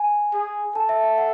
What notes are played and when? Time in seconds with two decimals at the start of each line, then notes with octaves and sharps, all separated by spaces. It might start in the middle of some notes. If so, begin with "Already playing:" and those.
Already playing: G#5
0.34 G#4
0.75 A4 A5
0.89 E5
1.04 E5
1.18 F#5